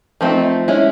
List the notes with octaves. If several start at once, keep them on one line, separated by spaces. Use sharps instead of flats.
F3 A3 C4 D#4
G#3 C#4 E4